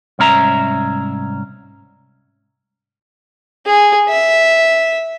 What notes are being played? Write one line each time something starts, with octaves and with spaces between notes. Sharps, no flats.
C2 G#2 C#4 E5 A#5
G#4
E5